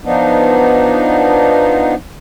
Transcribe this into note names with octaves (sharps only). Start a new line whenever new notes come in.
F3 B3 D4 D#4